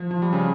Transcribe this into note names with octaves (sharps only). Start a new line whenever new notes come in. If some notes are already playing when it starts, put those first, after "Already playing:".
Already playing: F3
F3
G3
C#3